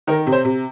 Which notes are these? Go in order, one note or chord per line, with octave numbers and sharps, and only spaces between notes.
D#3 A#4
C3
C5
C3